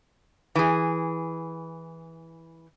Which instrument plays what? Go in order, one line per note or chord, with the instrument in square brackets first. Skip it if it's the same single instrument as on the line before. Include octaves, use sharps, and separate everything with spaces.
[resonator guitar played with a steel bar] E3 G#4